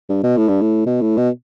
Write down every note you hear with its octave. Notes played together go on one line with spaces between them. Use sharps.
G2
B2
A2
G2
A2
B2
A2
B2